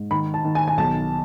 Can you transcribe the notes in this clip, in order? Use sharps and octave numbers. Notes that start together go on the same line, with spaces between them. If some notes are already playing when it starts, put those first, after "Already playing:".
Already playing: G#2
D#3 B5
A5
D#3
G#5
G#5
B1 A5